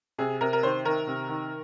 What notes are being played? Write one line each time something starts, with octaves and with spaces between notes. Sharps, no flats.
C3 G#4
C3 A#4
A#4
D#3 C5
D#3 A#4
C3
D#3